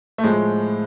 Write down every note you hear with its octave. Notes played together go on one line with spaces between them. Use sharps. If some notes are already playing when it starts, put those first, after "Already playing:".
A3
A2 F3 G#3